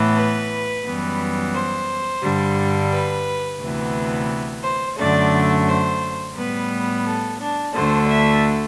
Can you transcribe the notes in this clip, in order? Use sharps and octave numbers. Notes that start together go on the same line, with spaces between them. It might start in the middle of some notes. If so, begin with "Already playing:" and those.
Already playing: A2 E3 B3
B4
F#2 E3 G3 B3
C5
G2 D3 G3
B4
D2 C3 E3 B3
C5
F#2 D3 A3 D5
C5
A2 G3 B3 B4
A4
D4
D2 D3 A3 C5
E5